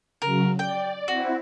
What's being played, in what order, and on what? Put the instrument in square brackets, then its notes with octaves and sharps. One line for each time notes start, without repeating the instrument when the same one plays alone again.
[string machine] C#3 F#3 [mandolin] A#4
[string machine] D5 [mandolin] G5
[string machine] C4 E4 [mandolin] F#4